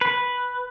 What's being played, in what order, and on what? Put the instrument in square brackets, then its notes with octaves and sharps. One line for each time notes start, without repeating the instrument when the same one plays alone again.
[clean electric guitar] B4